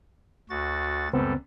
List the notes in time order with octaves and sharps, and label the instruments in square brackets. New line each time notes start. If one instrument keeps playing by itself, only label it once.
[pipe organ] D2 F#4 A6
[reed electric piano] C#2 B3 C4 [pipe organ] F#2 G3 A4